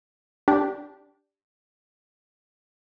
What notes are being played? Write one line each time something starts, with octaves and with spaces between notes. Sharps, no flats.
D4 G4